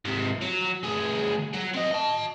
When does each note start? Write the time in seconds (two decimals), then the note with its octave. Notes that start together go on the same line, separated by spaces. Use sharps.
0.05 G#2 C3
0.41 F#3
0.83 D2 G#4
1.54 F#3
1.74 C4 D#5
1.91 D#5 A5